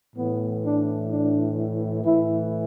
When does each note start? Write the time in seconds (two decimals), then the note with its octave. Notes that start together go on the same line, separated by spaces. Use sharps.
0.16 A2 E3 B3
0.64 D4
1.11 D4
2.05 A2 E3 E4